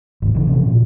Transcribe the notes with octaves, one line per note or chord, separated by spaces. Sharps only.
G#1 D#2
C#3 E3
C3 F3 C#4
A#2